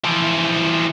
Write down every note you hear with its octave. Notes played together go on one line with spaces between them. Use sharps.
E3 F3